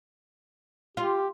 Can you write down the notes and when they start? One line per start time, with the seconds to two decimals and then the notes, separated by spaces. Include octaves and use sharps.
0.97 F4 G4